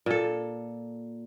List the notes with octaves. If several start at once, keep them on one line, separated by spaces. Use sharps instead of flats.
A#2 A4